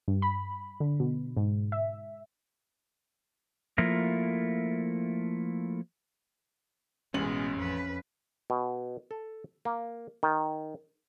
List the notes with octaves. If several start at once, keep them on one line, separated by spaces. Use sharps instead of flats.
G2
B5
D3
B2
G#2
E5
F3 A3 A#3 E4 F4 A#4
A1 B2 G#3 C#4 F#7
F2 B4
B2
A4
A#3
D#3